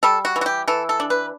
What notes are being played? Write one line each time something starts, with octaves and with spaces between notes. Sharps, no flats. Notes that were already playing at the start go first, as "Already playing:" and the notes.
G3 A4
F#4
E3
F#4
G4
E3 A4
A4
D4
B4